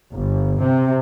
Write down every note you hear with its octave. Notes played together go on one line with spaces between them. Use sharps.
G1
C3